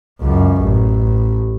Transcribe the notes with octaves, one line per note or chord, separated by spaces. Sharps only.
C#2 F#2
A1